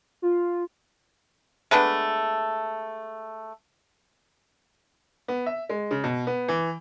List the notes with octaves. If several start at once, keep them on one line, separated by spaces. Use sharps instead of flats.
F4
G#3 A3 B3 D4
B3
E5
G#3
C#3
B2
B3
E3